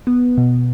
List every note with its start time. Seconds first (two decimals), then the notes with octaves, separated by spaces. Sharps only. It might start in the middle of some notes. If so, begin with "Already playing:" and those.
0.07 B3
0.38 B2